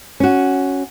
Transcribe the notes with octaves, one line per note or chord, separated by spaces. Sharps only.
C#4 F#4